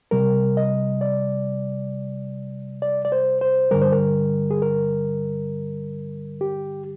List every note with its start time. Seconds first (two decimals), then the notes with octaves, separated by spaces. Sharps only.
0.11 C3 G3 A#4
0.57 D#5
1.01 D5
2.82 D5
3.05 D5
3.12 C5
3.41 C5
3.71 G2 D3 G3 A#4
3.82 C5
3.92 A#4
4.51 G#4
4.62 A#4
6.41 G4